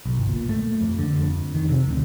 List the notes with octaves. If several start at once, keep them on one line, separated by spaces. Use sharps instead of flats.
B1
G1
A#2
A3
F2
D3
F2
D#3
C3
D2